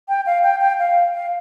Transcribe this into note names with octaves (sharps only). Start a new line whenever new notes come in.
G5
F5
G5
G5
F5
F5